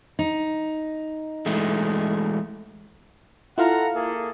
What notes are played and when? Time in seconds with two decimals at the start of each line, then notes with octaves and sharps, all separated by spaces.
0.19 D#4
1.46 E3 G#3 A3
3.58 E4 F4 A4 F5 F#5 A#5
3.95 A#3 G#4 A4